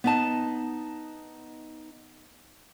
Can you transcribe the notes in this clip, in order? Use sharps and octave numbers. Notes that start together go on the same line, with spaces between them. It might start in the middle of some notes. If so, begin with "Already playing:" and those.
B3 D#4 A5